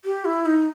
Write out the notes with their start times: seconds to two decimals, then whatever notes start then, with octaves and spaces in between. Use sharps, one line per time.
0.05 G4
0.25 E4
0.46 D#4